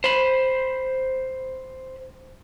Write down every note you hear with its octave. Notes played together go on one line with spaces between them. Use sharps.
C5 B5